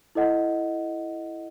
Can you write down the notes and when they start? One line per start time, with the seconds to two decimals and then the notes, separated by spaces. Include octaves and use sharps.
0.15 E4 A4 D#5 F#5